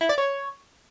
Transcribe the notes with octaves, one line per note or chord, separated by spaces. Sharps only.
E4
D5
C#5